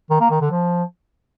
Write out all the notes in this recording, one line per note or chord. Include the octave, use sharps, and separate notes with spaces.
D#3
A#3
D#3
D3
F3